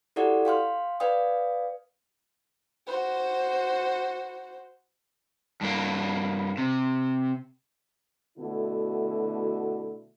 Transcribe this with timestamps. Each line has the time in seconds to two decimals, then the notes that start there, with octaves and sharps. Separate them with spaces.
0.16 E4 F#4 G4 A4 D5 F#5
0.45 F5 G5 C6 F6
1.00 B4 D5 F5 G5 D#6
2.87 F#4 C5
5.61 G2 A#3
6.57 C3
8.38 B2 D3 A3 E4 F#4